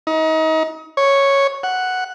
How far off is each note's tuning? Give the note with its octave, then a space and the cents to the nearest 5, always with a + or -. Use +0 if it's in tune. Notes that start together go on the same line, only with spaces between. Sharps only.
D#4 +35
C#5 -5
F#5 +0